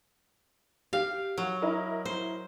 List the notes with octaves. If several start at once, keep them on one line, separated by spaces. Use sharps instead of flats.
G4 F5
F#3
E4 A#4 D#5
C5